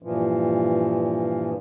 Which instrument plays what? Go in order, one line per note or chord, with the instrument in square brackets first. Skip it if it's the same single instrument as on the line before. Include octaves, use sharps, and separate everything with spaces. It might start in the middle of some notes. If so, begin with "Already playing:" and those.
[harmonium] G2 A#2 E3 F3